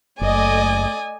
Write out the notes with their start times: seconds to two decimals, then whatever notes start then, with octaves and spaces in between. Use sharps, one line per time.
0.21 F#1 A3 D5 D#5 G#5 D6 D#6